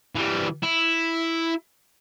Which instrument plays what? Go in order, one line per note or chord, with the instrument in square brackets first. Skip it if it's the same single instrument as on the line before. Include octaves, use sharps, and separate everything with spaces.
[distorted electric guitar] E3 G3
E4